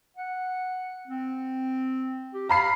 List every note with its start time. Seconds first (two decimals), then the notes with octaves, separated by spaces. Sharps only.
0.17 F#5
1.08 C4
2.34 G4
2.49 F5 A#5 B5 C7